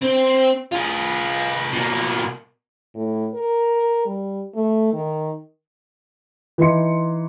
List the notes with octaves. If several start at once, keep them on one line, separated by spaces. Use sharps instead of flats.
C4
F4 G#4
B2 A#3
A2
A#4
G3
A3
D#3
E3 D#4 C6 C#7